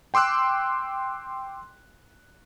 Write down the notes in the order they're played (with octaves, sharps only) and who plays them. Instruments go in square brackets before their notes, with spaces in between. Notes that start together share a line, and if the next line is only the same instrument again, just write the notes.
[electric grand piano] G5 C6 D6 E6 F#6